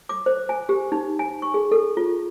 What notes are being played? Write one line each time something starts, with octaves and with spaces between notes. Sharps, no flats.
D6
C5
G#5
G4
D#4
G#5
C#6
G#4
A4
F4